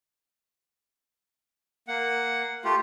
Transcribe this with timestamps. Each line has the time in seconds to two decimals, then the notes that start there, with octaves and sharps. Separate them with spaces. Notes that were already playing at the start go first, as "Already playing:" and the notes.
1.88 A#3 F#5
2.65 A3 F4 G4